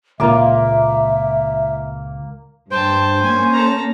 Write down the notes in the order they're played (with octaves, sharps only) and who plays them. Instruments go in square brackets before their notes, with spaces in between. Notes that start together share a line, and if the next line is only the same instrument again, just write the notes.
[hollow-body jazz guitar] C#2 A#2 F4 [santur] A#3 D6 [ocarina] E5
[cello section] G2 [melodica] C5 [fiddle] G5 A5
[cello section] A#3 C#4 [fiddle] G#5
[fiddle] A4 A#5